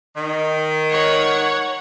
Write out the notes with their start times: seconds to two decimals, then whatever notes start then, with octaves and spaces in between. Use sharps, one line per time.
0.16 D#3
0.89 C#5 F#5